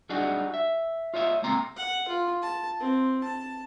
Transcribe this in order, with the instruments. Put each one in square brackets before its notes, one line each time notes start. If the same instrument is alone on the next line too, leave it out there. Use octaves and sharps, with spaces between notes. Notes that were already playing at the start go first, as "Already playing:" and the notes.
[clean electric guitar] F#3 G3 D4 D#4 F#4 G#4
E5
F4 C#5 D#5 E5
C#2 A#3 C4 A#5 C6
[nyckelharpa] F#5
F4
A5
C4
A5